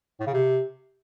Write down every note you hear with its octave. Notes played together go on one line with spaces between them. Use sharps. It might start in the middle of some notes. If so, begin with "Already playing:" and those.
A2
C#3
C3